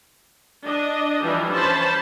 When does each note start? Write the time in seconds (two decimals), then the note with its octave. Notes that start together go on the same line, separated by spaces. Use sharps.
0.64 D4 D#5
1.23 E3 F3 G3 D4
1.52 C#4 C5 A5 B5